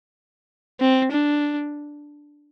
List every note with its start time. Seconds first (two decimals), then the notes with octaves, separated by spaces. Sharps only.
0.80 C4
1.12 D4